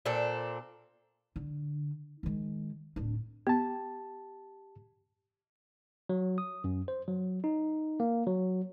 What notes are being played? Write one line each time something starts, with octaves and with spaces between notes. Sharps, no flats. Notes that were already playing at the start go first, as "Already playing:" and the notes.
A#2 C4 D4 A4
D3
D#3 G#3
D1 D4
B3 G4 A5
F#3
D#6
F#2
C5
F#3
D#4
A#3
F#3